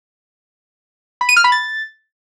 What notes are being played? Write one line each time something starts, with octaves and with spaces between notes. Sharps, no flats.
B5
D#7
F6
B5
A6